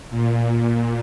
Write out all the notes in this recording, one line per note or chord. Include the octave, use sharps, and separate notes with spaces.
A#2